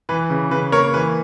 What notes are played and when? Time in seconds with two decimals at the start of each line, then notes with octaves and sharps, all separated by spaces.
0.09 E3 B4
0.30 C#3
0.51 C#3 B4
0.72 A#3 A#4 C#5
0.94 E3 B4